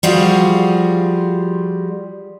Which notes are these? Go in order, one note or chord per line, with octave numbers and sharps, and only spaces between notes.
F3 G3 F4 F#4 G#4